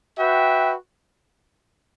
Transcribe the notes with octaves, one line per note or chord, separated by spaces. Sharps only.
F#4 B4 E5 G5